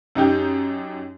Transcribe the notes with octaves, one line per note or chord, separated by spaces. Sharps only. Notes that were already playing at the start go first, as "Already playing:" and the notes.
F#2 D#4 G4 G6